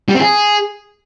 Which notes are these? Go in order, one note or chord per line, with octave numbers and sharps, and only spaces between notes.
G3
C4
G#4